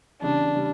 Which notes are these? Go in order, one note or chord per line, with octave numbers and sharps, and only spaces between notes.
E2 C#3 G3 D4
C#3 G3